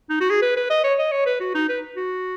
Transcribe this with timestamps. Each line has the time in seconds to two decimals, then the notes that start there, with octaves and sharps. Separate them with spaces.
0.10 D#4
0.21 F#4
0.30 G#4
0.42 B4
0.56 B4
0.70 D#5
0.84 C#5
0.99 D#5
1.12 C#5
1.26 B4
1.40 F#4
1.55 D#4
1.69 B4
1.96 F#4